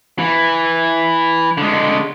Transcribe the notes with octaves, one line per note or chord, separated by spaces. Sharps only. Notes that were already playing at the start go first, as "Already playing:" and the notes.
E3
D3 G#3